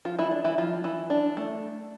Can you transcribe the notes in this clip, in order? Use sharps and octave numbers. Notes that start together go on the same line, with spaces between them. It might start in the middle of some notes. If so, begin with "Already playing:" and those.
F3 F4
E3 E4
D4
E3 E4
F3 F4
E3 E4
D4
A3